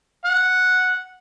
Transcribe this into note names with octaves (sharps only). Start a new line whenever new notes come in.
F#5